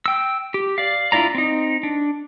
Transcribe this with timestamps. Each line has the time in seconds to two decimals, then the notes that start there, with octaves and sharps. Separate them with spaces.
0.06 G5 E6
0.54 G4
0.78 D5 F5
1.12 D4 E4 F4 D5 A#5
1.35 C4 D#4
1.83 D4